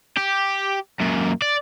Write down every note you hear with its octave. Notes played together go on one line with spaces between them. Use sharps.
G4
F#2 A#2
D5